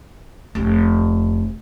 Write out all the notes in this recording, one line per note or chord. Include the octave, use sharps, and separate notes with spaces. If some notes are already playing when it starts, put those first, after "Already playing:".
F1 C#3